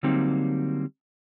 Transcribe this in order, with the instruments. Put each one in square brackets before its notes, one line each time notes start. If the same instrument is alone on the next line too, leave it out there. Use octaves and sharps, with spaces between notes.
[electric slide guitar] D3 F#3 G3 A#3 C4 D#4